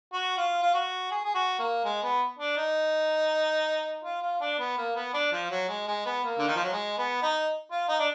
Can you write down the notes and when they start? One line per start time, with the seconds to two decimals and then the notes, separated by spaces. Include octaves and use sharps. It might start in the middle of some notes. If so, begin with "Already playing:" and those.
0.13 F#4
0.37 F4
0.62 F4
0.74 F#4
1.11 G#4
1.24 G#4
1.35 F#4
1.59 A#3
1.84 G#3
2.03 B3
2.39 D4
2.57 D#4
4.04 F4
4.22 F4
4.41 D4
4.59 B3
4.78 A#3
4.95 B3
5.14 D4
5.32 F3
5.50 F#3
5.68 G#3
5.87 G#3
6.06 B3
6.24 A#3
6.38 D3
6.47 D#3
6.56 F3
6.64 F#3
6.73 G#3
6.98 B3
7.22 D#4
7.71 F4
7.89 D#4
7.99 D4